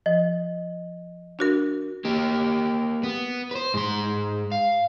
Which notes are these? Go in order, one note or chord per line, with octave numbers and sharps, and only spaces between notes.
F3 D#5
D4 F#4 A#4
A#3 G4
B3
B4 C5
G#2 C6
F5